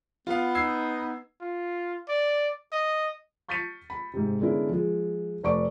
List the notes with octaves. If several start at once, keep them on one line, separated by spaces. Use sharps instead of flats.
B3 F4 F5
D#4 E6 G#6 C7
F4
D5
D#5
C#6 G6 A6 B6 C#7 D#7
B5
G#2 C3
D3 G#3 B3 C#4 E4 A#4
F3 G#3
F1 B4 D5 C#6 D6 D7